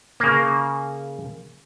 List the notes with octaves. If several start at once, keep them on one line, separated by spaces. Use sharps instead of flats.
C#3 A#3